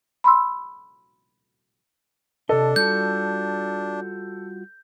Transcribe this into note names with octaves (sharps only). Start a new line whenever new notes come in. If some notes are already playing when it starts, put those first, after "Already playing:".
B5 C6 E6
C3 D4 A4 D#5
G3 F4 F#4 G6